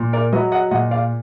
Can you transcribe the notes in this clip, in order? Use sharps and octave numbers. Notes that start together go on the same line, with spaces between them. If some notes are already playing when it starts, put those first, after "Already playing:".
Already playing: A#2
A#4 D5
F#3 B4 D#5
D#5 F#5
A#2 D#5 F#5
D5 F5